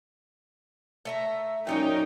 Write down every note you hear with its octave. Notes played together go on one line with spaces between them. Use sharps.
A3 E5 A#5
F#2 A#2 C#4 D#4 C#5 G5